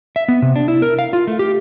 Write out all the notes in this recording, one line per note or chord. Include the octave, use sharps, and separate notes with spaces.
E5
B3
C3
D4
E4
A#4
F5
F4
A3
G4